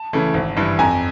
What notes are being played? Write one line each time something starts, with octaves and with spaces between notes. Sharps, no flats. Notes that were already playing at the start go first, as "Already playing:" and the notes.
Already playing: A5
C#3 E3 A3
G#1
G2 E3
F2 G#5 A#5